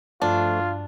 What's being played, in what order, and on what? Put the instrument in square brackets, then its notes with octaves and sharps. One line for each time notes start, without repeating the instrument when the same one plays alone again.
[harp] G2 F#4 D7 [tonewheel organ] F3 A3 [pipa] D4 [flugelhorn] F4